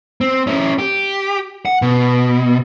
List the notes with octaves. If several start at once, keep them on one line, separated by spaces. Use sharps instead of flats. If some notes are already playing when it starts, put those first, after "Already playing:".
C4
C#4 E4
G4
F#5
B2